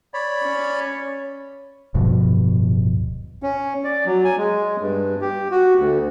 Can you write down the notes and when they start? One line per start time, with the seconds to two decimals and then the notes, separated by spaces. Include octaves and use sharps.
0.14 C#5 D5 B5
0.43 C#4
1.95 D1 G2 B2 F3
3.43 C#4
3.84 D5
4.05 F#3
4.24 G#5
4.37 G#3
4.81 G2
5.21 G4
5.51 F#4
5.78 D2